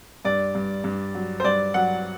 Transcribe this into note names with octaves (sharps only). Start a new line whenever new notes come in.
G2 D5
G2
G2
F#3
C5
G2 D5
F#3 F#5